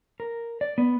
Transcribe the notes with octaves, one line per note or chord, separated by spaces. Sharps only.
A#4
D5
B3